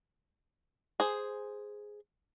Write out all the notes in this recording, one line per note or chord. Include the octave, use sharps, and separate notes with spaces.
G#4 C5